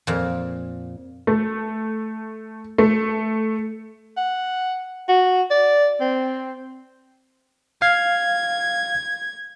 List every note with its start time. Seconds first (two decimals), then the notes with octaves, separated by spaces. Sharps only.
0.07 F2 A#2
1.27 A3
2.78 A3
4.17 F#5
5.09 F#4
5.51 D5
6.01 C4
7.82 F5 G#6